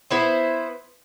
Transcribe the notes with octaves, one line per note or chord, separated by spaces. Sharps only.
B3 E4 C5